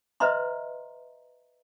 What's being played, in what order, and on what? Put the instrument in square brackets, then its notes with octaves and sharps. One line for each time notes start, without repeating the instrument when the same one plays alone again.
[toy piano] B4 C5 D#5 E5 A#5 C6